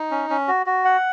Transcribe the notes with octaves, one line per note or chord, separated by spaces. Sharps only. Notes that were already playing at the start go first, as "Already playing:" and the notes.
Already playing: D#4
C#4
C#4
F#4
F#4
F#5